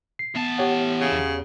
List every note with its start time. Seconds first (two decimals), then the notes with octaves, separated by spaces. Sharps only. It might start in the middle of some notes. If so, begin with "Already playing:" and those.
0.19 C7
0.36 E3 B3 A5
0.58 G4 C#5 F#5
1.01 C#3
1.12 E2